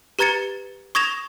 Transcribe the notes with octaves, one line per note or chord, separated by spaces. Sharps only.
G4 B4 A#5 G#6 A6 C#7
C#6 D#6 G#6 A#6 E7 F7